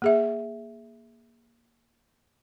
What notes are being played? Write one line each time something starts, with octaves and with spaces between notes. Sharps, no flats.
A#3 G#4 E5